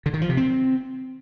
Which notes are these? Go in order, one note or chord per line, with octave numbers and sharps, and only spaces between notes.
D3
D#3
F3
C3
C4